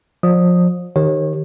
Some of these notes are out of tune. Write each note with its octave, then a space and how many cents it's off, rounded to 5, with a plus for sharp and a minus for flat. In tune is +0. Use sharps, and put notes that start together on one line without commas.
F3 +30 D5 +30 D#6 +0
D#3 +0 G4 +0 C#5 -30